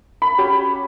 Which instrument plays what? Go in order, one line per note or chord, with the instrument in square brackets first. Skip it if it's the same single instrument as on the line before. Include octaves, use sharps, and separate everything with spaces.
[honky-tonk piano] B5
[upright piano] C#4 F#4 G4